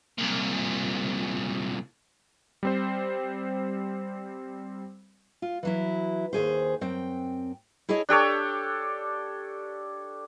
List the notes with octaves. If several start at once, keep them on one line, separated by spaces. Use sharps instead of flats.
C2 A#2
G3 C4 C5
F4
E3 F#3 E4
D#2 A#2 G#4 C5
F#2 C4 G5
E4 G#4 A4 C#5 D#5
D4 G4 A4 C#5